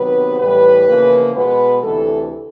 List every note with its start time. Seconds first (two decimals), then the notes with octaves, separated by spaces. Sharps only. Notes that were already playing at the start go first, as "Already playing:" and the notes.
Already playing: C3 D#3 F#3 B3 B4
0.39 A2 E3 G3 B4
0.87 E2 C#3 F3 A#3
1.35 B2 G#3 B3 B4
1.83 D2 C3 E3 A4